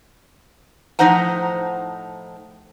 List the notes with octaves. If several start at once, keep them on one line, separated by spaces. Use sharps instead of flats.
A2 F3 D#4 C5 F#5 A#5